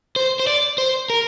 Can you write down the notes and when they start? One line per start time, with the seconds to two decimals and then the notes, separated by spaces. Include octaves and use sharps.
0.16 C5
0.40 C5
0.47 D5
0.78 C5
1.10 A#4